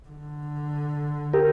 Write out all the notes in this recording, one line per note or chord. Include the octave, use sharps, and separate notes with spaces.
D3
G4 A#4